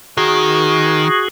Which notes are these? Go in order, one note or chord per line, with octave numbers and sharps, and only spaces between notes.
D#3 F#4 G#4